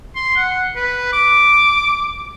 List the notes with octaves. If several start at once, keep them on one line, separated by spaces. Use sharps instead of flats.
C6
F#5
B4
D6